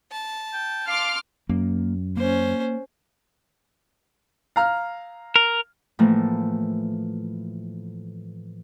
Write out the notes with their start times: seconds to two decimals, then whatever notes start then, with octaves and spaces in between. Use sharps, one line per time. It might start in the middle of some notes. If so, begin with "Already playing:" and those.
0.12 A5
0.53 G5
0.87 F5 C6 D6 F6
1.49 F#2 A#3
2.17 A#3 C#4 C5
4.56 F5 A#5 F6
5.36 A#4
5.99 A2 E3 F3 A3 A#3